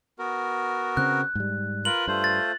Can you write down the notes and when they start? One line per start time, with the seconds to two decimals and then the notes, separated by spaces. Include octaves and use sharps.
0.19 B3 F#4 A#4
0.97 C#3 C4 F#6
1.35 G#2 G3
1.85 F4 A#4 B4 F#7
2.08 G2 A3 F4 C5
2.24 A6